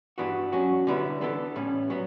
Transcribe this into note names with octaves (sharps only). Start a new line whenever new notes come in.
G2 E3 B3 D4 F#4
F#3 C#4 F#4
D3 G3 B3 E4
E3 B3 D4 A4
A2 G3 C#4
F#3 B3